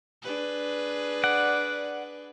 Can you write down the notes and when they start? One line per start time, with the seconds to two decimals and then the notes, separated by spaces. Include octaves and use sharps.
0.22 D4 G#4 B4
1.24 D5 F#5